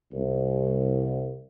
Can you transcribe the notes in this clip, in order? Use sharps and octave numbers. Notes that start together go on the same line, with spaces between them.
C2